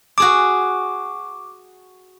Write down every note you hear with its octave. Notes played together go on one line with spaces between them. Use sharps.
F#4 G#4 A5 D6